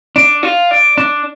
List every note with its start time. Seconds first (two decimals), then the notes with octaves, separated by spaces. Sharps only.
0.16 D4
0.43 F4
0.71 D4
0.98 D4